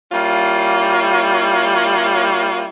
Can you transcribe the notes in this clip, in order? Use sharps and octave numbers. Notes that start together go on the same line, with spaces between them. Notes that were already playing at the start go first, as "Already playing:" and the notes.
G3 A#3 C#4 E4 F4